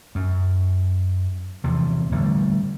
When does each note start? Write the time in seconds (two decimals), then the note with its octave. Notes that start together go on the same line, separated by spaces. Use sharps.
0.15 F#2
1.64 E2 C3 F3
2.12 A1 D3 G3